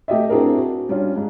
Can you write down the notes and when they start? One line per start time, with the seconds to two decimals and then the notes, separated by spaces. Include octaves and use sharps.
0.08 A3 G4 D#5 E5
0.30 C4 D4 E4 F#4 G#4 A#4
0.57 F#4
0.89 G3 C#4 D4 F4
1.16 G#2